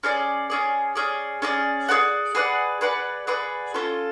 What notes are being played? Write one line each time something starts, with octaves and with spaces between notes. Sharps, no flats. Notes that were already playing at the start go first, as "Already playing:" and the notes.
C#4 G#4 D5
C#4 G#4 D5
C#4 G#4 D5
C#4 G#4 D5
G#4 B4 D5 F#5
G#4 B4 D5 F#5
G#4 B4 D5 F#5
G#4 B4 D5 F#5
C#4 F4 A4